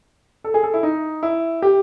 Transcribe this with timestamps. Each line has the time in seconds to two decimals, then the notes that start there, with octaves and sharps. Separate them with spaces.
0.44 A4
0.54 G#4
0.63 A4
0.74 E4
0.83 D#4
1.23 E4
1.62 G4